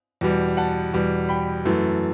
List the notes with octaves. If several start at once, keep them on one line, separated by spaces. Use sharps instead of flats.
E2 B2 G3
F#5 A5
E2 B2 G3
G5 B5
F#2 E3 A3